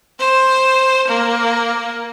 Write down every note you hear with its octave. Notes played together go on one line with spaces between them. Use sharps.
C5
A#3